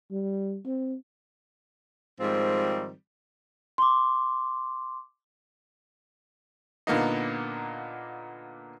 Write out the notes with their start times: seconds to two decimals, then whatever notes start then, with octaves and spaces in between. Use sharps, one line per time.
0.11 G3
0.66 C4
2.20 G#2 D#3 F3 G3 C4
3.78 C6 D6
6.87 A#2 D3 A#3 B3 D#4